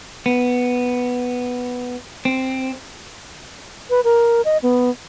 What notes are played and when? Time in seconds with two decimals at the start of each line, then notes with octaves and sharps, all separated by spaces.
0.26 B3
2.25 C4
3.90 B4
4.04 A#4
4.45 D#5
4.63 B3